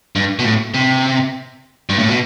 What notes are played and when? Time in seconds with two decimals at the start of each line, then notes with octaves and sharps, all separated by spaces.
0.16 G2
0.39 B2
0.45 A2
0.74 C3
1.89 G2
1.99 A2
2.09 B2